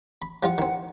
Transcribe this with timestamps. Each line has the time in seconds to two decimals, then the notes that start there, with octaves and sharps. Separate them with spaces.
0.22 B5
0.43 F3 G3 F4 F#5
0.58 D#3 C4